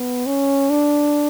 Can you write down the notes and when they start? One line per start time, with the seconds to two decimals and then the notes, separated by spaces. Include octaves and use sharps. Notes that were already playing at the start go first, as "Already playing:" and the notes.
Already playing: B3
0.27 C#4
0.70 D4